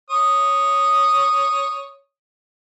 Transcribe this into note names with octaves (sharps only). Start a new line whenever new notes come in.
C#5 D#6